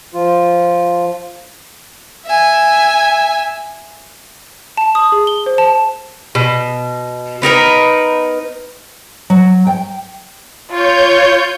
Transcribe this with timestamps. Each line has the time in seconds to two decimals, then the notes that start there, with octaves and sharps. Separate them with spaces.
0.14 F3 F4
2.26 E5 G#5
4.77 A5
4.95 D#6
5.12 G#4
5.27 G7
5.46 C5
5.58 A5
6.35 B2
7.42 B3 D#4 A#4 B4
9.30 F#3
9.67 G5
10.70 F4 C#5 G6